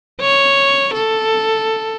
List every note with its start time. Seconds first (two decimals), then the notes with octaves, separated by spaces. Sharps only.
0.21 C#5
0.94 A4